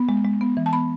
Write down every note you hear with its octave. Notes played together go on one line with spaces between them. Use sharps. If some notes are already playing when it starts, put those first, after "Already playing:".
Already playing: B3
G#3
G#3
B3
E3
A5
B3 B5